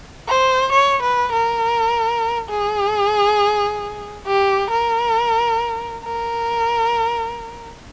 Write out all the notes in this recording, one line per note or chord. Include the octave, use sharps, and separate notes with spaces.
C5
C#5
B4
A#4
G#4
G4
A#4
A#4